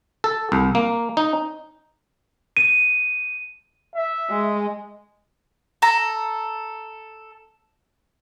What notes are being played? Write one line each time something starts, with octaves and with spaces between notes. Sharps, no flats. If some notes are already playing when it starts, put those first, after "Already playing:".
A4
C2
A#3
D#4
D#7
E5
G#3
A4 A#5